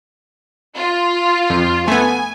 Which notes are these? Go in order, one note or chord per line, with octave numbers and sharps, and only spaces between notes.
F4
F2
A3 B3 G#5